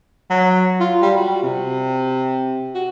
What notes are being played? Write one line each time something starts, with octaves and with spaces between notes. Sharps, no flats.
F#3
F4
G3
F#4
C3
F#4